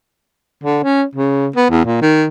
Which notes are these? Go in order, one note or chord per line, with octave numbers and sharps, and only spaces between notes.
D3
C#4
C#3
B3
E2
A#2
D#3